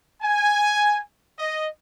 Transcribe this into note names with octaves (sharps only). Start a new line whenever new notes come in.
G#5
D#5